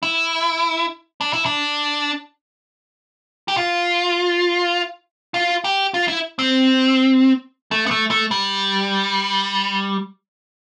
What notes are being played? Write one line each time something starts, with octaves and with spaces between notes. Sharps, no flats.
E4
D4
E4
D4
G4
F4
F4
G4
F4
E4
C4
A3
B3
A3
A3
G3